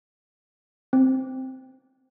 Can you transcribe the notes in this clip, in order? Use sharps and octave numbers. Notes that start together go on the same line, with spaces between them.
C4